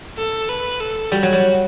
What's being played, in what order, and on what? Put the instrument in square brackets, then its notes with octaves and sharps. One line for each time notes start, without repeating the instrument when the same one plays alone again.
[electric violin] A4
B4
A4
[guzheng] G3 [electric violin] F#4
[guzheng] F#3
G3